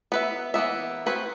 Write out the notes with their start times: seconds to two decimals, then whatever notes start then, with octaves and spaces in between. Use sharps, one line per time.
0.12 B3 B4 E5
0.54 E3 A#3 B3 E5
1.06 C4 F#4 G#4 B4 F#5